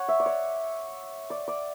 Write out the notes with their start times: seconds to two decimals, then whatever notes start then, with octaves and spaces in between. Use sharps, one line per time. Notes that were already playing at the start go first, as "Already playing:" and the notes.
Already playing: C#5 F#5
0.08 E5
0.20 D5
0.26 C#5
1.30 D5
1.48 D5